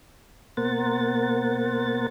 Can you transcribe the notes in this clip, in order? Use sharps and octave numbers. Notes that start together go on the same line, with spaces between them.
B2 A#3 A#4 C5 F#5 A6